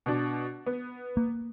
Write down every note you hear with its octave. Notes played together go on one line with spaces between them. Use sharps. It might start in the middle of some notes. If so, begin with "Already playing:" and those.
B2 D4
B3
A#3